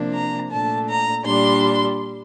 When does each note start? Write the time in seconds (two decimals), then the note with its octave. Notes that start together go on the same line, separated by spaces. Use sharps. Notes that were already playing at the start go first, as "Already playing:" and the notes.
Already playing: C3 F3 A#3 D4
0.13 A#5
0.51 A#2 A3 D4 A5
0.88 A#5
1.25 A#2 G3 D4 C6